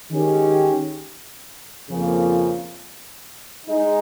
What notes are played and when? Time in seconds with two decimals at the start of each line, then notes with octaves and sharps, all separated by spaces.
0.11 D#3 G#3 C#4 G4
1.89 F2 C#3 F3 A#3
3.66 G#3 D#4